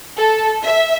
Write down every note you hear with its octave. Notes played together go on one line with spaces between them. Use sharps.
A4
E5